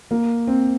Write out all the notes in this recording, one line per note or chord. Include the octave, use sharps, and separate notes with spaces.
A#3
C4